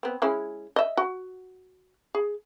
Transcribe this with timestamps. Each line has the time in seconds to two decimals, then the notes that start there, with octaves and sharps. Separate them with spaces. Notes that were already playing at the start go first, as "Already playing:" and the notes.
0.03 B3 C4
0.22 G#3 C#4 E4
0.76 D#5 E5
0.97 F#4
2.15 G#4